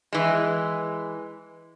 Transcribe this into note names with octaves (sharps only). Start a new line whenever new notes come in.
E3 G#3